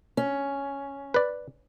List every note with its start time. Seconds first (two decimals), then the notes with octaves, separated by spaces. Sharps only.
0.17 C#4
1.14 B4 D5